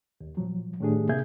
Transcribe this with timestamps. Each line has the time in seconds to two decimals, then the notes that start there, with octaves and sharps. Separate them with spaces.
0.21 D#2
0.37 A#2 F3 F#3
0.80 A2 D#3 A3 D4 G4 G#4
1.09 C3 A#3 G#4 E5 G6 G#6